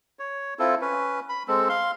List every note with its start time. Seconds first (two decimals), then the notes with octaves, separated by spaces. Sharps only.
0.19 C#5
0.59 C4 E4 F4 A4
0.81 C#4 B4
1.29 B5
1.48 G#3 C4 A4
1.69 F5 C6